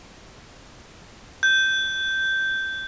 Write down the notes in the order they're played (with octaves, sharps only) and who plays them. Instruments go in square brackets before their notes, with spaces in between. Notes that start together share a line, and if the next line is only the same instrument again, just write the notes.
[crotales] G6